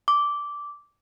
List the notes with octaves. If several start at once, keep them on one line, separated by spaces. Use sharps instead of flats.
D6